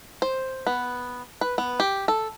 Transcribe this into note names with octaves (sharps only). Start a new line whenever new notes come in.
C5
B3
B4
B3
G4
A4